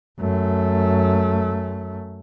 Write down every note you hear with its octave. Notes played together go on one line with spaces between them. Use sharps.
F#2 A3